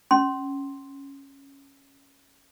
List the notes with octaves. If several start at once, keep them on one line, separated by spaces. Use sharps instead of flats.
C#4 C6